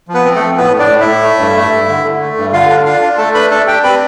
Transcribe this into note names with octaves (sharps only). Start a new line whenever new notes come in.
F3
B3 B4
C4
A3 A4
F3
A2 B3 B4
A2
D4 D5
A2
E4 E5
A2
A3
G2
A3
G2
D3
D3
A3
G2
D3 F4 F5
D4
D4 F4 F5
D4
A3 A4 A5
D4 B4 B5
D4 A4 A5
D4 G4 G5
C4 B4 B5